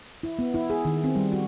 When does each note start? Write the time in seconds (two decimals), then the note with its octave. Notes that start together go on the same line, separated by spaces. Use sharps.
0.23 E4
0.39 B3
0.54 E4
0.70 G#4
0.85 D#3
1.04 C4
1.16 G3
1.32 F#4